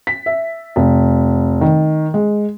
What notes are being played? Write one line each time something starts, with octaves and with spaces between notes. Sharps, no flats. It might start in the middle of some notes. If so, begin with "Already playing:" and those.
B6
E5
F1
D#3
G#3